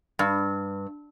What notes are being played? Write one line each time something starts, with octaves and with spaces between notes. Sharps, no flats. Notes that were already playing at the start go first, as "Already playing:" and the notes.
G2